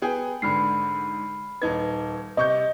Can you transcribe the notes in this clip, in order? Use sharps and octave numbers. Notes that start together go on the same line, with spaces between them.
B3 G#4 G5
G#2 D3 B5 F6 C7
D#1 D#4 B4 G#6
C3 D#5 C#6 G6